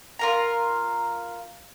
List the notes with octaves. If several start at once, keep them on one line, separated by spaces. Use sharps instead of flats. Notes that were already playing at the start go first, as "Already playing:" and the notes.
F4 A#4 A#5